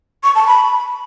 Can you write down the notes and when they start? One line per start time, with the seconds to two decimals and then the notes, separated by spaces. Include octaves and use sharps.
0.24 C#6
0.35 A5
0.47 B5